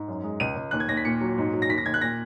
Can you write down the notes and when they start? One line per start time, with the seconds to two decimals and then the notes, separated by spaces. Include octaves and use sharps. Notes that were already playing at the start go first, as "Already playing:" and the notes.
Already playing: G#2
0.08 F#2
0.24 G#3
0.40 C#2 D#7
0.56 C#2
0.71 D#2 F#6
0.80 G#6
0.88 D#2 A#6
0.97 B6
1.05 A#2 C#7
1.21 F#3
1.38 G#2
1.53 F#3
1.62 A#6
1.69 D#2 B6
1.78 A#6
1.85 D#2 G#6
1.94 F#6
2.01 A#2 A#6